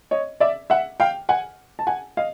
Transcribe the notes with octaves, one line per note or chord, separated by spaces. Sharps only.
C#5 D#5
D5 E5
E5 F#5
F5 G5
F#5 G#5
A5
F#5 G#5
D#5 F5